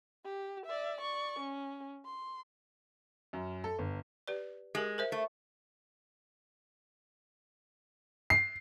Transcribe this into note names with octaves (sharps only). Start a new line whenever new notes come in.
G4
D5 E5
D5 C#6
C#4
C6
F#2
A4
G1
G4 B4 D5
G#3 G4 A#4
A#4 C5 E5
A3
C7